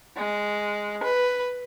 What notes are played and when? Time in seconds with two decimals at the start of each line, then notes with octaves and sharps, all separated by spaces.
0.16 G#3
1.03 B4